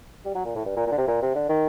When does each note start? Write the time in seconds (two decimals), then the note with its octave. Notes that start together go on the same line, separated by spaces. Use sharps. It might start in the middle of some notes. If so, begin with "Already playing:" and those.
0.25 G3
0.35 F#3
0.45 A#2
0.56 A2
0.66 G2
0.77 A#2
0.87 A#2
0.92 D3
0.98 C3
1.08 A#2
1.22 C3
1.35 D3
1.49 D#3